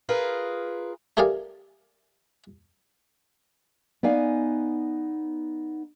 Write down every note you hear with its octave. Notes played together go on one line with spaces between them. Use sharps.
F4 G#4 A#4 B4
A3 G4 G#4 A#4 D5 F5
B3 D#4 D5 F5 G#5